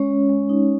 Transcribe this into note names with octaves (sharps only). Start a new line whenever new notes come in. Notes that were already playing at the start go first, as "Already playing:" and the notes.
Already playing: G#3 C#4 C#5
G#3
G#3
D#4